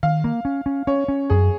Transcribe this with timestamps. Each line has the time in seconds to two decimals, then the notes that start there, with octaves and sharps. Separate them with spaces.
0.03 D#3 F5
0.24 A#3
0.45 C#4
0.66 C#4
0.87 C#4 C#5
1.08 C#4
1.30 F#2 G#4